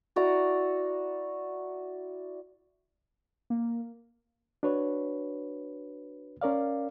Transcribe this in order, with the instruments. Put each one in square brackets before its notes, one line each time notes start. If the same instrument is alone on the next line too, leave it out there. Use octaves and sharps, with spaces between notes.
[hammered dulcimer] E4 F#4 D5 A#5
[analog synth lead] A#3
[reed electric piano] D4 F#4 B4 C#5
C#4 A#4 D5 F5